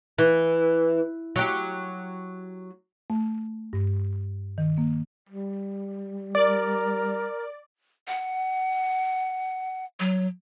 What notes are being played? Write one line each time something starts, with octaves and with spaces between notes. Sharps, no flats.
E3
F#3 G4
A3
G2
D#3
A#3
G3
A#4 D5
F#5
F#3